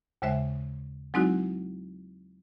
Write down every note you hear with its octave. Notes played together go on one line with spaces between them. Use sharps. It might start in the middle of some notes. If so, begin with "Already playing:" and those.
D#2 C#3 G#3 C5 E5
F#3 G#3 C4 D#4 E4 F#4